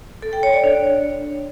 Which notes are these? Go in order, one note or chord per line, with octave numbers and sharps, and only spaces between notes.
A4
G5
C#5
D5
D4